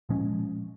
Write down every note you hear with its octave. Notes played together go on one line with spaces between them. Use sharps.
A#2 F3 G#3 C#4